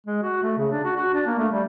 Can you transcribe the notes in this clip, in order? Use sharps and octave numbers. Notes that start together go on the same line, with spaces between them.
G#3
F#4
A3
C#3
D4
F#4
F#4
D4
A#3
A3
G3